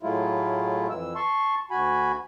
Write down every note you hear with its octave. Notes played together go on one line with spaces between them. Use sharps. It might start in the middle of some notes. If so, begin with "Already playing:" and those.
A2 F#3 G#3 A3 E4 F4
F2 E3 E6
A5 C6 C#6
D2 F#4 G#5 B5